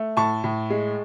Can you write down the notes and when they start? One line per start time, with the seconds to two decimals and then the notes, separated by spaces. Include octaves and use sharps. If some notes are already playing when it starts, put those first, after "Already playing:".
Already playing: A3
0.17 A2 A5 C#6
0.44 A2
0.70 G#3